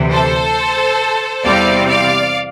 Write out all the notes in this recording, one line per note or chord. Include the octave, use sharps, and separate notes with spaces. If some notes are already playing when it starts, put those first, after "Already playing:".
Already playing: D2 C3 E3
A4 C5
E2 C3 G3 C4 D5 F5
D5 F5